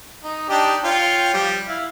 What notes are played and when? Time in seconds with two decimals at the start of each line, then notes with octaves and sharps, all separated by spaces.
0.24 D#4
0.49 D4 D#4 G4
0.84 F4 C#5 G5
1.34 F3 G3
1.68 E4 F5